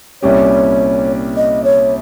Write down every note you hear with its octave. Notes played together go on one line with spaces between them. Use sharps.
C2 A#2 G3 C#4 G4 C#5
D#5
C#5